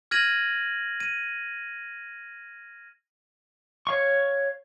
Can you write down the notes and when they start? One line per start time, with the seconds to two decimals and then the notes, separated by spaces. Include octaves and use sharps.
0.11 F6 G#6 A#6 D#7 F#7
1.00 D#7
3.87 C#5 F5 C#6